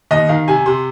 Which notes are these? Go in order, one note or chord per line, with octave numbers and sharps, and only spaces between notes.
D#2 D#5
D#3 F5
C3 G#5
C3 C6